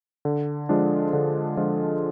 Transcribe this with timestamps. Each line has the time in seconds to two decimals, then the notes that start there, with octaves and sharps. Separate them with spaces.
0.25 D3
0.69 F3 G#3 D4 F4
1.13 D3
1.57 F3 G#3 D4 F4